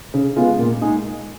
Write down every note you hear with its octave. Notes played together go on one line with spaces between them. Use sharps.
C#3
G#3 B3 F4 G#4
A#2
G#3 D#4 G#4